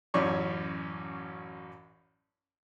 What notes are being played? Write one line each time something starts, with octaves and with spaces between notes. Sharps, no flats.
A1 F#2 C#4 D5 C#6